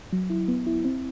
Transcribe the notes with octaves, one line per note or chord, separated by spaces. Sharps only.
F#3
E4
B3
E4
C4